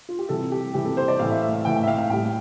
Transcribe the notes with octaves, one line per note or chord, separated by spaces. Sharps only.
F4
G4
C3 E3 G3 A4
G4
C3 E3 G3 G4
A4
C5
D5
A2 E3 A3 F5
E5
E5
F5
A2 E3 A3 G5
G5
E5
F5
F5
A2 G3 G5